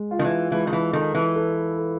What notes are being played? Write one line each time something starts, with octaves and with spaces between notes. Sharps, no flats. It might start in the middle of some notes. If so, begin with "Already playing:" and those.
Already playing: G#3
F4
D#3
E3
E3 G#3
D#3
E3
D#3 A4
E3
A4
A4